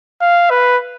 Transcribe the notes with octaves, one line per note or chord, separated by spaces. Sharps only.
F5
B4